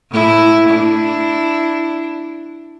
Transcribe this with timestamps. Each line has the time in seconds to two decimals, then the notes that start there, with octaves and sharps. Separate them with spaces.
0.12 A2 E4
0.69 D4 E4